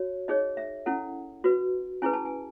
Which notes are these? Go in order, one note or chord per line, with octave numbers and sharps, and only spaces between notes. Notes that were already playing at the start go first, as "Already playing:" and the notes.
Already playing: F#4 C#5
D#4 G#4 C#5 D#5
E5
C#4 E4 A4 F#5
F#4 B4
C#4 E4 G#4 B4 G#5
A5
G#5